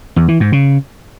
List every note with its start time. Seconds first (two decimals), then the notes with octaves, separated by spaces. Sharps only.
0.16 E2
0.28 E3
0.40 G#2
0.52 C#3